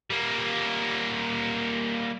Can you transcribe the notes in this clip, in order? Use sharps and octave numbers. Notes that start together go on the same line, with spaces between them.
G3 A#3